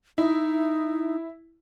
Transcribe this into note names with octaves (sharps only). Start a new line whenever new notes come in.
D#4 E4